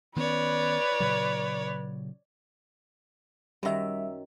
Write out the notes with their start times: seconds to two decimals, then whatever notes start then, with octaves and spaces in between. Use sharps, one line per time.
0.17 D#3 B3 C#4 B4 C#5 D5
1.00 A#2 C#3 F#3
3.63 F#2 D#3 G3 E5 A#5